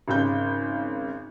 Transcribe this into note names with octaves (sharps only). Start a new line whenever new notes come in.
G#1 C#3 G6